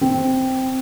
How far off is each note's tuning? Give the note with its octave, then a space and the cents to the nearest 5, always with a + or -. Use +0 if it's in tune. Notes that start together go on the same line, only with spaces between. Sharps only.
C4 +0